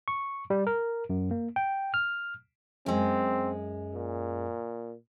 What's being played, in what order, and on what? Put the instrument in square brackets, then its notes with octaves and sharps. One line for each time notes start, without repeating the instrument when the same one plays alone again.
[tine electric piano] C#6
G3
A#4
F#2
A#3
G5
F6
[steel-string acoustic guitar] F#2 G#3 [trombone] C4
[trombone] A#2